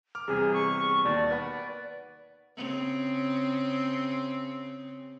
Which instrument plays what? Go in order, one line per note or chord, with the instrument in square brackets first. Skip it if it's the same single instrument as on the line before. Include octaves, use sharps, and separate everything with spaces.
[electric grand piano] D6 F6
[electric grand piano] E2 C3 G3 [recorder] G#4
[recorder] C#6
[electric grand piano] D#2 B2 [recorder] D5
[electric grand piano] B4 F#5 B5
[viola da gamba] C#3 C4